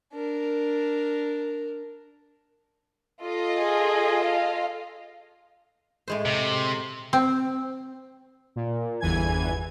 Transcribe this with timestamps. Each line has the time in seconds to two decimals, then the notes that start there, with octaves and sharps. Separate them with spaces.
0.14 D4 A#4
3.22 F4 A4 D#5
3.59 G#4
4.25 F5
6.08 A2 G#3 C5
6.25 C3
7.13 C4
8.56 A#2
9.00 G1 E2 E3 G#5 G#6